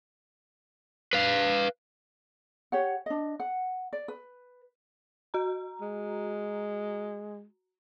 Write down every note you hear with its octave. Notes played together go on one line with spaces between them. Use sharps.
B4 F5
G4 C#5 F#5
D4 D#5
F#5
D5
B4
F#4 A#5
G#3